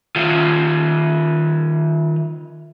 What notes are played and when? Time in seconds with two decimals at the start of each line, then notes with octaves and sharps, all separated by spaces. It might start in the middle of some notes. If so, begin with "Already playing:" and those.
0.16 D#3 F4